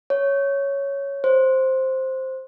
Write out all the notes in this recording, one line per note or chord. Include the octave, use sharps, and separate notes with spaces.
C#5
C5